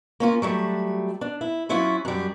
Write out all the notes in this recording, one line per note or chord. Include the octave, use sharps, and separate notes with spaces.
A#3 C#4 F4
F#3 G3 A3
D4
E4
F#3 C#4 E4 F4 C#5
F#2 G3